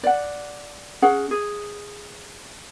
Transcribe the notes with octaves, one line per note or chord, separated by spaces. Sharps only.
D5 F#5
C#4 G#4 F#5
G#4